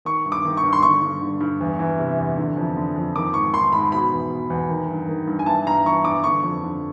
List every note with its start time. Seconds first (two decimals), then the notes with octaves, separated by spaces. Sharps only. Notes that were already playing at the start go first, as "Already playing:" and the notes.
0.05 D#3 C#6
0.25 G2
0.32 D6
0.45 D#3
0.57 C#6
0.63 G2
0.73 C6
0.82 D3 C#6
1.02 G2
1.21 D3
1.40 G2
1.61 E2
1.79 E3
1.99 C3
2.18 E2
2.37 D3
2.57 F2
2.77 D3
2.96 F2
3.16 D#3 D6
3.34 G#2 C#6
3.54 D#3 C6
3.72 G#2 B5
3.92 B2 B5
4.12 E2
4.30 B2
4.50 E2
4.69 D#3
4.89 G2
5.09 D#3
5.27 G2
5.39 G#5
5.46 E3 A5
5.66 G2 A#5
5.85 E3 C#6
6.04 G2 D6
6.24 D3 C#6
6.43 F2
6.63 D3